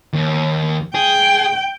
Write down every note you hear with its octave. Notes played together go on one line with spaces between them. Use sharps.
D#2
G#4 G5